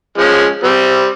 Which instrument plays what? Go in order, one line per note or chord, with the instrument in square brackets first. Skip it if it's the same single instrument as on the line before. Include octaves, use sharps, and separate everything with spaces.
[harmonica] F3 G#3 C#4
G3 C4